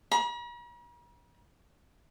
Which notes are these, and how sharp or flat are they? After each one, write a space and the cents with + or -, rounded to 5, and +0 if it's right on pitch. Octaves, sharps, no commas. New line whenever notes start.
A#5 +45